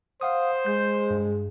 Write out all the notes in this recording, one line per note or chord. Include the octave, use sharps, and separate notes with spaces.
C5 F5 F#5 D#6
G#3 G6
G2